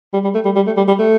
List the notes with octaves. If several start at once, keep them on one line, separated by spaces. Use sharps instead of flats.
G3
G3
A3
G3
G3
A3
G3
G3
A3